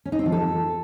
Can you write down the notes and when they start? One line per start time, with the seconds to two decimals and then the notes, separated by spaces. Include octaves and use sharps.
0.05 C#4
0.12 D#4
0.19 C4
0.26 F3
0.32 A4